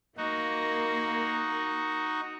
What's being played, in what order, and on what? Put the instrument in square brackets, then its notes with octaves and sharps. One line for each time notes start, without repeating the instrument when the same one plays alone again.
[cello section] A#3 [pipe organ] D#4 F#4